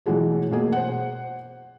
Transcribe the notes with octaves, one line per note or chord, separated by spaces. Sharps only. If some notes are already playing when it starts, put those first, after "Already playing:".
B2 E3 F#3 G#3 A3
B2 A#3 G#4
C5 F#5